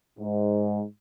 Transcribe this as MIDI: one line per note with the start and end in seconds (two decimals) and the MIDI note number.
0.19 0.83 44